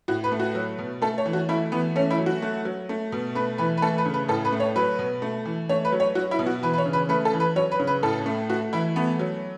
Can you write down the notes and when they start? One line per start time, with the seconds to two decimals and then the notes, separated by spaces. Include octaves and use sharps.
0.08 A2 F#4
0.24 B4
0.32 A3
0.40 F#4
0.55 F#3
0.79 B2
1.02 A3 A4
1.18 C#5
1.26 E3
1.33 F#4
1.49 A3 E4
1.72 E3 B3
1.96 A3 C#4
2.11 E4
2.18 F#3
2.26 F#4
2.42 A3
2.65 F#3
2.89 A3
3.12 B2
3.35 A3 B4
3.58 E3 B4
3.77 B4
3.82 A3 A4
3.98 B4
4.06 C#3
4.14 B4
4.28 A2 A4
4.45 B4
4.52 A3
4.60 C#5
4.76 F#3 B4
4.99 B2
5.22 A3
5.45 E3
5.69 A3 C#5
5.85 B4
5.92 F#3
6.00 C#5
6.15 F#3 F#4
6.31 E4
6.39 B2
6.47 F#4
6.63 E3 B4
6.73 B4
6.78 C#5
6.86 C#3
6.93 B4
7.09 A3 B4
7.25 A4
7.33 E3
7.40 B4
7.56 F#3 C#5
7.72 B4
7.80 C#3
7.87 B4
8.03 A2 A4
8.26 A3
8.50 A3 F#4
8.73 E3 E4
8.96 A3 B3
9.19 F#3